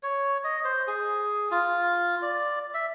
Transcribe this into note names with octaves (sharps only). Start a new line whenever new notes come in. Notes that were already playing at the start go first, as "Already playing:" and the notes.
C#5
D#5
C5
G#4
F4
D5
E5